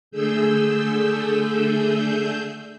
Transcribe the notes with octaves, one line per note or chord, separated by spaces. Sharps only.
D3 A3 G#4 E6 G6